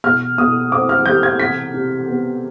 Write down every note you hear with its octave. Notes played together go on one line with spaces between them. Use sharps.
B2 F6
B2 D#6
C4 D6
F6
G3 G6
G#6
C3 B6
C3
B3